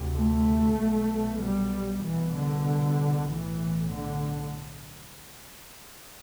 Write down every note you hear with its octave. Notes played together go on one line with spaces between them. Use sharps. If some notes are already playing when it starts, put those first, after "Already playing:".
Already playing: D2 C3
A3
B1 B2
G3
C2 B2 E3
D3
B1 A2 E3
D3